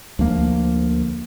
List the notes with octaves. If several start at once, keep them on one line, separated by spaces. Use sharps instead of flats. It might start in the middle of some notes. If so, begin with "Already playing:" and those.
D2 F3 A#3